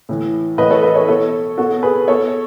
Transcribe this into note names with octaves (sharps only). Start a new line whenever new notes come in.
A2 E3
A2 E3 B4 D#5
A4 C#5
B4 D#5
A4 C#5
B2 A4 C#5
B2 F#4 A4
G#4 B4
B2 A4 C#5